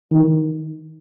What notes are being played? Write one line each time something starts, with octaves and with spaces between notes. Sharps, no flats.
D#3